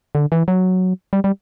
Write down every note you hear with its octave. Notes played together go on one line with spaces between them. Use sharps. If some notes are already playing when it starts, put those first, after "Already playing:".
D3
E3
F#3
G3
G3